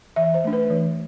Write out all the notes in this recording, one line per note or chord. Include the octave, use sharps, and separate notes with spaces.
E3 E5
C5
A3 D4
B4
E3